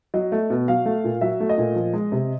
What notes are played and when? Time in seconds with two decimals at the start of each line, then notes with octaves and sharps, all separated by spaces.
0.14 F#3 D#5
0.32 A3
0.50 B2
0.68 F#3 F5
0.85 A3
1.04 A#2
1.21 F#3 E5
1.40 A3
1.49 D#5
1.58 A#2
1.76 F3
1.94 G#3
2.12 C3